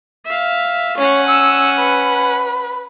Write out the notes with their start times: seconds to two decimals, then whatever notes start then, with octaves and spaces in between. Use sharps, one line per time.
0.26 E5 F5
0.98 C#4 C#5 F#5
1.29 E6
1.79 B4